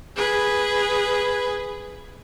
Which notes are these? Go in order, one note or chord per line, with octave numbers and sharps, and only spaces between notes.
G#4 B4